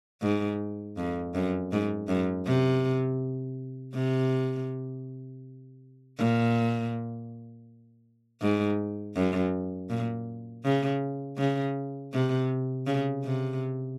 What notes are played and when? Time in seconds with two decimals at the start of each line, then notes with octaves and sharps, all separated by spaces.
0.22 G#2
0.98 F2
1.35 F#2
1.72 G#2
2.08 F#2
2.46 C3
3.94 C3
6.18 A#2
8.42 G#2
9.15 F#2
9.90 A#2
10.65 C#3
11.38 C#3
12.13 C3
12.87 C#3
13.24 C3